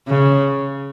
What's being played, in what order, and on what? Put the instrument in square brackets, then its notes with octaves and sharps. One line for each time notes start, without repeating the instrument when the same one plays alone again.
[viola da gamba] C#3